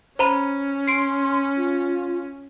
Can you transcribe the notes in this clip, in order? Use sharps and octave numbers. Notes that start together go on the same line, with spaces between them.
C#4 C5 A#5 B5
C6 C7 D7
F4